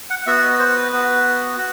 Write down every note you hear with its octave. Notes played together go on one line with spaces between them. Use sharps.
F#5
B3 F#4 E5
D#5
C5
B4
B3 F#4
F#4